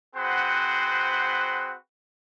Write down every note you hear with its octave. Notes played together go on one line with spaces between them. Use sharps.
C4 F#4 G#4 B4 C5 F#5